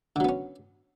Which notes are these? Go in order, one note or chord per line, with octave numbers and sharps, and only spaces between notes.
D3 F#3 B3 C#4